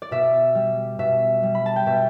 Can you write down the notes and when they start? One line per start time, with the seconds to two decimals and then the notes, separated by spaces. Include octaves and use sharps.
0.02 D5
0.11 B2 E5
0.55 G3
0.99 B2 E5
1.43 G3
1.55 B5
1.66 A5
1.76 G5
1.86 B2 E5